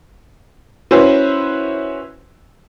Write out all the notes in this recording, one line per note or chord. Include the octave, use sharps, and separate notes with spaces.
C#4 E4 F#4 B4 C5